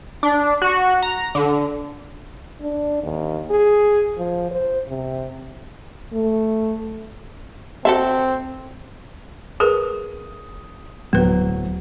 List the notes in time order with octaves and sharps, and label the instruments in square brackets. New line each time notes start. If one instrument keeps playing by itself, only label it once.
[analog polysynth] D4
F#4
A#5
D3
[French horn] D4
D#2
G#4
F3
C5
C3
A3
[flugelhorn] C4 [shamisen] F#4 A4 E5
[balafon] G#4 A#4 B4 [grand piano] D#6
[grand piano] D1 F#3 [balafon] B3 B4